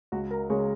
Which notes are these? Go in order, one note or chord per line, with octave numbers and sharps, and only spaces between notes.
C#2 F#4
A#4
C#3 G#3 C#5